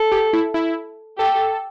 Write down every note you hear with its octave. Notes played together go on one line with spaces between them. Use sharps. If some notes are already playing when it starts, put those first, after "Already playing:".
Already playing: A4
G4
E4
E4
G4 A4